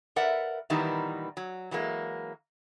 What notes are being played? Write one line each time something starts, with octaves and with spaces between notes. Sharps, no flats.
A#4 B4 D5 E5 F#5
A#2 D#3 E3 G3 B3 D#4
F#3
E3 F#3 G#3 A#3